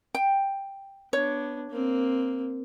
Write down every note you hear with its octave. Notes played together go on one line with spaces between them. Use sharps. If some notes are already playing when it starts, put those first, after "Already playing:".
G5
B3 D4 C#5
A#3 C4